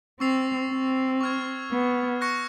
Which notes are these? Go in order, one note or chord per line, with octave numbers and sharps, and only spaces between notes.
C4 C#6 E6 A6 C7 F7
C4
C#6 F6 G#6
B3
C#6 F#6 A#6 C#7